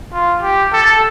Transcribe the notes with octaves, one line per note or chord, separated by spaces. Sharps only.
F4
G4
A4